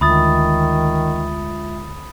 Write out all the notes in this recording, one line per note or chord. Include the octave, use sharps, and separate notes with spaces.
D2 D#3 G#3 F4 E5 B5 D#6 A6